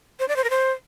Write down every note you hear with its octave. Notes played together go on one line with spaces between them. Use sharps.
C5
D5
C5
A#4
C5